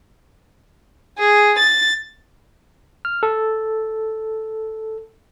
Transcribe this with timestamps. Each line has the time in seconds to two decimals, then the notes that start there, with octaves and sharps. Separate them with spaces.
1.18 G#4
1.58 A6
3.05 F6
3.23 A4